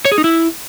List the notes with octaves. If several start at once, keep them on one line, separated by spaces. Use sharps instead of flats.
C#5
G#4
D#4
E4